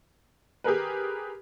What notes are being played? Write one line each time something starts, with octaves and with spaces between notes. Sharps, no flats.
G4 G#4 A#4 B4